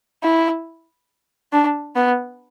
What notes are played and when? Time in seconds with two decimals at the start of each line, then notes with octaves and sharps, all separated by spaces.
0.23 E4
1.53 D4
1.96 B3